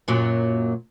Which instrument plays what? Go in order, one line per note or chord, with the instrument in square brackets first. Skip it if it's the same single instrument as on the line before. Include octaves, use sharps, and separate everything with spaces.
[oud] F#2 A#2 F#3